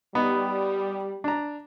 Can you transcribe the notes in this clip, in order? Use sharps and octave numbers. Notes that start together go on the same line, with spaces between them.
G3 B3 D#4
D4 A#5